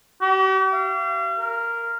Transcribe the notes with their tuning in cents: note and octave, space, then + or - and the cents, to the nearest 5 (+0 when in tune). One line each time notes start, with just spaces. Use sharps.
G4 -45
F5 -40
A#4 -5